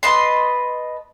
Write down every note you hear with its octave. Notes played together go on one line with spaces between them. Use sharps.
B4 D#5 A5 C6